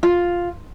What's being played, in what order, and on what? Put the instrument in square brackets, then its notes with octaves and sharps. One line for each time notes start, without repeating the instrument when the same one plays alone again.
[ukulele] F4